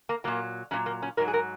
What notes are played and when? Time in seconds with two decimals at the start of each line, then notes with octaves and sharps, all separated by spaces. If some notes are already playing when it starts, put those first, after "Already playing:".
0.09 A#3
0.24 A#2 F#3 A#3
0.71 A#2 F#3 C#4
0.86 A#3
1.02 C#4
1.17 G#2 F#3 A#4
1.28 G#4
1.34 A#4